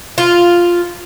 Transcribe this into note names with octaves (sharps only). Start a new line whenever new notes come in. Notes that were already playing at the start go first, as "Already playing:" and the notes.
F4